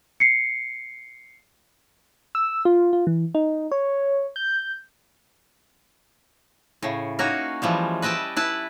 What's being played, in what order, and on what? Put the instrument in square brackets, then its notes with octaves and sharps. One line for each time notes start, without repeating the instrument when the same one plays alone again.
[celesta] C7 C#7
[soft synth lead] E6
F4
F4
E3
D#4
C#5
G6
[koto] A2 C#3
A#3 C#4 D#4 F#4
E3 F3 G3 G#3
B4 D#5 E5 G5 A5
E4 B4 A5